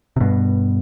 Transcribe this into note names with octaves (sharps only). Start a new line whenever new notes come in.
C3
G2 B2